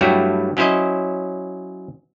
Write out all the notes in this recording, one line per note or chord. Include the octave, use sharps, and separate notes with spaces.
G2 F#3 G3 A3 E4 F#4
F#3 C#4 E4 C5 D#5